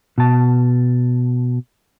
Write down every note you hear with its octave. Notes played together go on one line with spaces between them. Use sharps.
B2 A5